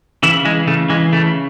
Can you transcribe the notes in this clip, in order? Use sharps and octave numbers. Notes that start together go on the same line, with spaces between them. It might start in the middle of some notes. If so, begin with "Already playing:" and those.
C#3 E3 E4
E3 G#3
C#3 A3
E3 G#3
C#3 A3